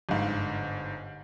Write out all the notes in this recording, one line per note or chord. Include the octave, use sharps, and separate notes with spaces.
G1 G#2 F5